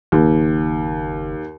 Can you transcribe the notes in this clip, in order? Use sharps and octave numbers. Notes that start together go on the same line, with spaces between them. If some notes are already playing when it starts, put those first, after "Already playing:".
F#1 D#2